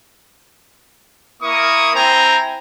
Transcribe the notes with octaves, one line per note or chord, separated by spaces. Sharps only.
A#3 E4 A#4 C#6 D#6
C4 E4 C5 G5 G#5 A#5